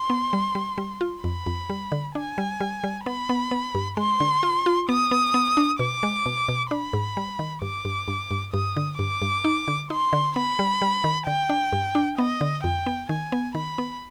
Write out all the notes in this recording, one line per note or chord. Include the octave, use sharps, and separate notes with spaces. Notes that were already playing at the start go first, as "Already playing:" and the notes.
Already playing: C6
B3
G3
G3
G3
F4
F2 B5
F2
G3
D3
D4 G#5
G3
G3
G3
B3 B5
B3
B3
G2
G#3 C6
D3
F4
F4
B3 D#6
B3
B3
D4
B2 D6
G#3
B2
B2
D4 B5
G#2
G3
D#3
G2 D6
G2
G2
G2
G2 D#6
D3
G2 D6
G2
D#4
D3
D#4 C6
D3
B3 B5
G3
G3
D#3
D3 G5
D4
G2
D4
B3 D#5
D3
F2 G5
B3
D#3 G#5
B3
D#3 B5
B3